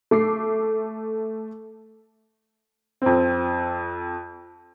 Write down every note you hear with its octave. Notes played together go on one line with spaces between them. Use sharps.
A3 D6 C7
F2 C4